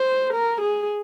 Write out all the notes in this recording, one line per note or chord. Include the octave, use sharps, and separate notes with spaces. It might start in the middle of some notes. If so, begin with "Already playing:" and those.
Already playing: C5
A#4
G#4